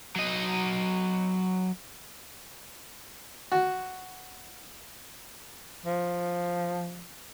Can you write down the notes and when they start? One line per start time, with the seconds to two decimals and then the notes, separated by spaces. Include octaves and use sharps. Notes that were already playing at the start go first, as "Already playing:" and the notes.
0.16 F#3 D#5
3.52 F#4
5.86 F3